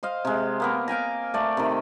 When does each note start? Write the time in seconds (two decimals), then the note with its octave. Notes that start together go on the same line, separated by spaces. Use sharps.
0.03 C5 D#5 F5
0.25 C3 G#3
0.60 A#3 B3 A#4
0.88 F5 G5 G#5 A#5
1.34 A3 D5
1.57 C3 D#3